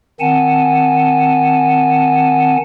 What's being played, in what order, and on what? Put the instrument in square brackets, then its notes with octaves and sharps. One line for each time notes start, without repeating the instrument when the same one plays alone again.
[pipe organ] D#3 C4 F#5 G#5 A5